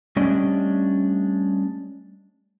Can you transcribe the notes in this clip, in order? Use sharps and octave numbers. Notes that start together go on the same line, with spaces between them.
G3 A3 C#4 D4 D5 D#5